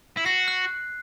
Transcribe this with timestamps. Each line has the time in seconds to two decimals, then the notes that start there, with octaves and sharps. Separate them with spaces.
0.17 E4
0.25 F#4 C7
0.48 F#6